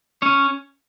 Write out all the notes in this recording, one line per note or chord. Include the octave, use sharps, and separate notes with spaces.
C#4 C#5